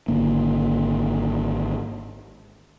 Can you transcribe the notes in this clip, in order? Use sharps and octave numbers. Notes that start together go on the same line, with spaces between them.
G#1 D3 A#3